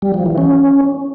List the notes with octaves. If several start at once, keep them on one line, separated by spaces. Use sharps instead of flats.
G3
F3
E3
C#4